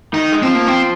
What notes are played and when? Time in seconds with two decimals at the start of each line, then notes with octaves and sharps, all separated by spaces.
0.13 D#3 D#4
0.32 G#3
0.42 F3 C4
0.55 A#3
0.68 C4